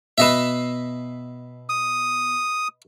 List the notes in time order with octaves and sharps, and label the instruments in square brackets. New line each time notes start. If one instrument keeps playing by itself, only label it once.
[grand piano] B2 C7 E7 [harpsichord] B4 D#5 E5
[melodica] D#6